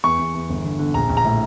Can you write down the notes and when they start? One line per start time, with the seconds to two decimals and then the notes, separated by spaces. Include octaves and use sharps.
0.04 E2 C#6
0.19 E2
0.34 E2
0.50 G1
0.64 D3
0.79 D3
0.94 A#1 A#5
1.10 A#1
1.17 A#5
1.25 A2